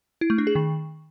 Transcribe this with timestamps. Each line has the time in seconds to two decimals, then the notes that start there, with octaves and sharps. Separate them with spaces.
0.21 E4
0.30 A3
0.38 D4
0.47 G#4
0.55 D#3